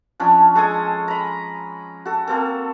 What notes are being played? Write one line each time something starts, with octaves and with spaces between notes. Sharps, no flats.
F3 C#4 D4
G#3 A4 G#5 D#6
A#5 B5
F#4 A4
A#3 C4 A4